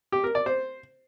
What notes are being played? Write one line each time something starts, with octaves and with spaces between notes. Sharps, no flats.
G4
A#4
D5
C5